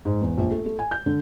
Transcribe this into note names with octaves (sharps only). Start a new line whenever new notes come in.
G#2
E2
A#1
A3
A3
G#5
G6
D3